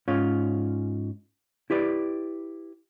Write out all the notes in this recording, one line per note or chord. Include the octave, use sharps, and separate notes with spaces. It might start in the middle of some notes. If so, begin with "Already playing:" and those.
G#2 C#4 F4 C#5
E4 G4 B4 D5